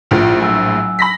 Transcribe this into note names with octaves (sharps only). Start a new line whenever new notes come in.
A#1 A2 F4
F#3 G#5 E6
B5 A#6 B6